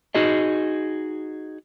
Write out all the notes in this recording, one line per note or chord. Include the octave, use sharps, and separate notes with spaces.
D#4 F#4 G#4 D#5